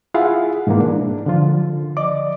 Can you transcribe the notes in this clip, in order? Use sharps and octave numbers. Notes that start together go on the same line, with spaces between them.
E4 F4 G#4 F5 F#5
G#2 B2 E3 G#3 A#3
D4
D3 F3 F4
D5 D#5 D6